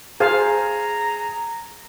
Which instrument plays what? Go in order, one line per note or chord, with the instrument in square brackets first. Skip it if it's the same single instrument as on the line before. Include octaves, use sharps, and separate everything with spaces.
[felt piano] G#4 [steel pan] C5 F5 A5 [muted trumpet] A#5